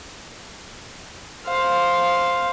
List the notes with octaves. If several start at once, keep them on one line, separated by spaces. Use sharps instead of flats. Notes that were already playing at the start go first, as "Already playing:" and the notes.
C5 F5